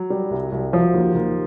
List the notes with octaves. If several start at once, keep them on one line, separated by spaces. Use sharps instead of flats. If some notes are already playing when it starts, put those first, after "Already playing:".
Already playing: F#3
G3
C2
C2
F3 F#3
D#2
D#2